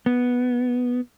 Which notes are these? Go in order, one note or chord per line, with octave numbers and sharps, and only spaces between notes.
B3